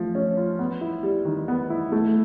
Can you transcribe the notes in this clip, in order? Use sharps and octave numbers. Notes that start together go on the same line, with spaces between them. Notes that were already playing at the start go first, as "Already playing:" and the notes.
Already playing: F3 A3
C#4
F4
B3
E4
G3
D#3
B3
E4
A3